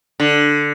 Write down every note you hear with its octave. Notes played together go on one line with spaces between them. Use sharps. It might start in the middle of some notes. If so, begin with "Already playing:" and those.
D3